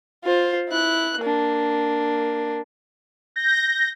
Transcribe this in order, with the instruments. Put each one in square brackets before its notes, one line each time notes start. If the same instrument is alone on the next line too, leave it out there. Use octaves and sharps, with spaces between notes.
[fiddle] F4 C5
E4 F#6
A#3 D4
[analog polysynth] G6 A#6